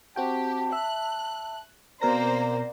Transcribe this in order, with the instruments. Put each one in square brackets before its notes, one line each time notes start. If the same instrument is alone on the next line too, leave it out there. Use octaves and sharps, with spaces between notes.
[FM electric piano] C4 F#4 G5 [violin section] G4 [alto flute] A5
[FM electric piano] E5 [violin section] F#6
[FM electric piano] B2 A#4 A#6 [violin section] A#3 C4 C5 [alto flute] D5 [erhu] A#5